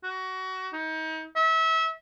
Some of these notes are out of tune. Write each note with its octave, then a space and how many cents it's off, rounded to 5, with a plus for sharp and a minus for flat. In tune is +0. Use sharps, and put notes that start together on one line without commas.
F#4 +20
D#4 +35
E5 -30